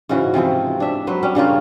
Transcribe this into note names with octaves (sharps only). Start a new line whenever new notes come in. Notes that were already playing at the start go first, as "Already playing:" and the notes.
G#2 C#3 E3 F#4
C3 E3 F3 C4
D4 E5
F#3 B4 C5
G3 C#4
G2 C#3 A#3 F4